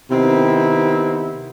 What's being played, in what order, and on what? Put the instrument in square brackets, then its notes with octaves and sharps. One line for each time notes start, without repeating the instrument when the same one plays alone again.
[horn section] C3 D#3 B3 C4 D#4 E4